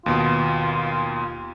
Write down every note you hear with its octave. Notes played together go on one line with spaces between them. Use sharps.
D#2 B2 F4